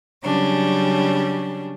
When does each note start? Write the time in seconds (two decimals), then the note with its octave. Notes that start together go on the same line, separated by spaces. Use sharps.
0.24 C#3 F#3 G3 C#4 D4